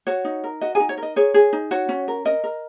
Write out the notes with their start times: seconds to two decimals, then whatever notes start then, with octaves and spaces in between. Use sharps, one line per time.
0.07 F#4 C#5
0.25 D#4
0.44 A#4
0.61 F#4 D#5
0.75 G#4 G#5
0.80 D#4
0.89 C#5
0.98 A#4
1.03 D#5
1.16 G#4 C#5
1.34 G#4
1.53 D#4
1.71 F#4 C#5
1.89 C#4
2.08 A#4
2.25 A#4 D#5
2.44 A#4